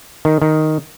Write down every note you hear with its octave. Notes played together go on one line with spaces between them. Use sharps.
D#3
D#3